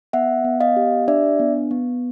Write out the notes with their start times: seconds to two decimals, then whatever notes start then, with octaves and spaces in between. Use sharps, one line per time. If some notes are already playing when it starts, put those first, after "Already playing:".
0.13 B3 E5 F#5
0.45 B3
0.60 D#5 F5
0.76 G4
1.08 D4 D5 E5
1.39 B3
1.71 B3